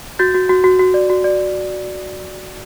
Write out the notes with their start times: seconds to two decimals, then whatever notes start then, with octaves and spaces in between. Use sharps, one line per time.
0.19 F#4 G6 A6
0.34 F#4
0.49 F#4
0.64 F#4
0.79 F#4
0.94 D5
1.10 F#4
1.24 D5